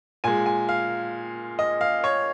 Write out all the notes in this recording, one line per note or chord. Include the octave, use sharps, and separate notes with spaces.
A#2 G#3 G#5
G#5
F5
D#5
F5
C#5